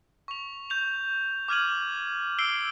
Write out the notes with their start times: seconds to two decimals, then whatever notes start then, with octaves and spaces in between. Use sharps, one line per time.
0.28 C#6 F7
0.70 C#6 G6 F7
1.48 D6 F6 G#6 D#7 F#7
2.39 E6 C7 D7 G7